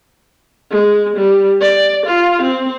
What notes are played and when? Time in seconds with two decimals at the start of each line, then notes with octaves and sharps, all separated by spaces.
0.71 G#3
1.17 G3
1.61 D5
2.06 F4
2.42 C4